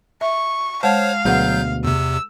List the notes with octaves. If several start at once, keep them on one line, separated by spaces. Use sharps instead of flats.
E5 C#6
G#3 C5 C#5 F5 F#5 A5
D2 B2 F#3 G#4 B4 F#5 G6
E2 C3 E6